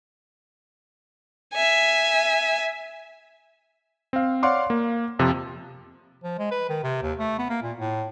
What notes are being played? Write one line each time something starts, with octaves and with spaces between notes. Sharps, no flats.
E5 G#5
C4 F5
C#5 D5 F5 F#5 C6 D6
A#3
F2 C3 F3
F3
G#3
B4
D#3
C3
D#2
A3
B3
A#3
A#2
A2